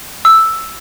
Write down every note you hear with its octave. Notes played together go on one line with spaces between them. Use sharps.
E6